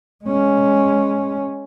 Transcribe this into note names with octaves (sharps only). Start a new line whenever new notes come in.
G#3 C#4